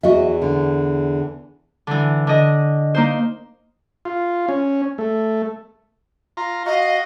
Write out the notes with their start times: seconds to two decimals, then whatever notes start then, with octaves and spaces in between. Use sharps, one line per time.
0.03 E2 F#4 D#5 E5
0.42 D3
1.87 D3 E3
2.27 D3 D#5
2.95 A#3 D#4 C5
4.05 F4
4.49 C#4
4.98 A3
6.37 F4 A#5
6.66 F#4 D#5 F5